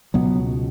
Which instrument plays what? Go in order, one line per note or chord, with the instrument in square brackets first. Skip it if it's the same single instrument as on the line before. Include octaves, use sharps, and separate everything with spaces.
[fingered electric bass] C#2 B2 F#3 B3